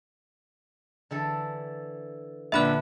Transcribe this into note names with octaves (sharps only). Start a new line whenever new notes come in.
D3 E3 A4
A#1 D3 B4 E5 B5 F#6